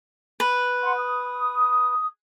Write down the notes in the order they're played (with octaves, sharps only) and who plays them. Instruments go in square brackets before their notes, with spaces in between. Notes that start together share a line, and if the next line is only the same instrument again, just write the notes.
[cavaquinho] B4
[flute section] F#5 C6
D#6